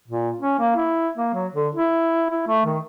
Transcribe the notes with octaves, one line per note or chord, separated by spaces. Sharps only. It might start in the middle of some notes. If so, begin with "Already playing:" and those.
A#2
C#4
A#3
E4
A#3
F#3
D3
E4
E4
A3
D#3